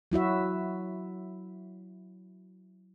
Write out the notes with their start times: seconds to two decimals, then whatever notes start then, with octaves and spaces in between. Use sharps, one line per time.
0.12 F#3 E4 F#4 E5